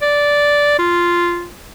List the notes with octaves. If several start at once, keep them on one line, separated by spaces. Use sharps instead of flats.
D5
F4